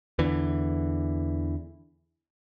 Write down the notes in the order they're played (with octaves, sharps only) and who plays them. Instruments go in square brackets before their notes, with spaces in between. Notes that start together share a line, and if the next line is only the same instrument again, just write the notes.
[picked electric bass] E2 D3 E3